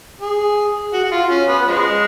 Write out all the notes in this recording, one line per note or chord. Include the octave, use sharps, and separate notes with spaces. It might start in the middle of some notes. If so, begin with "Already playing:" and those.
G#4
F#4
F#4
F4
C#4
B3
F3 G#3